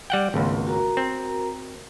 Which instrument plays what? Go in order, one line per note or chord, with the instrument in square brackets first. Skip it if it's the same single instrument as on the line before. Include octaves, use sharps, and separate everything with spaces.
[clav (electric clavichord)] G3 F#5 G5
[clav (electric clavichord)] G#1 C#2 [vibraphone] A3 B3 C6
[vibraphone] F#4 A#4 A#5
[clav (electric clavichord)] C4